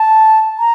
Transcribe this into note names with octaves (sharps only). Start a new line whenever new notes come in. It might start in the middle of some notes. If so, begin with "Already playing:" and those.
Already playing: A5
A#5